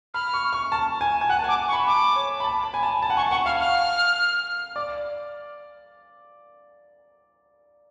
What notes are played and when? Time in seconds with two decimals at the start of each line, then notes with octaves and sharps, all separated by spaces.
0.14 B5 F6
0.33 C#6
0.53 C#6
0.72 A5
1.01 G#5
1.21 G#5
1.29 F#5 F#6
1.39 A5
1.44 G#5
1.48 D6
1.68 C#6
1.73 B5
1.87 A5 D6
2.16 C#5
2.40 B5
2.44 A5
2.64 B5
2.74 G#5
2.83 A5
3.02 A5
3.10 F#5
3.17 G#5 C#6
3.31 F#5 C#6
3.46 F5 F6
3.60 F6
4.76 D5